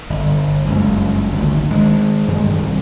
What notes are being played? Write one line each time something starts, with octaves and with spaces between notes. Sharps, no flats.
G1
F#1 C#2 G2
G#1 D2
D#3 G#3
G2 D#3 G3 G#3
C2